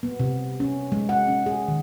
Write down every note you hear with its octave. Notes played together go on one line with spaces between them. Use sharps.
B3
C3
C#4
G#3
F#5
C#4
G#4
D#3